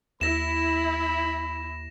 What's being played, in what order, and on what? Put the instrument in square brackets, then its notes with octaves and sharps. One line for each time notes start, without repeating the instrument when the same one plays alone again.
[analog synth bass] D#2 [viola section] E4 [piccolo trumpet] B5 [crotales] A#6 E7